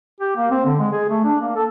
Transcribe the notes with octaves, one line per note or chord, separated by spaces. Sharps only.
G4
A#3
C4
D3
G#3
G#4
A3
D4
A#3
A4